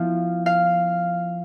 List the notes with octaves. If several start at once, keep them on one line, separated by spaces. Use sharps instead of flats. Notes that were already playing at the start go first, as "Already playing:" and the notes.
Already playing: F3 B3 E4 F5
F5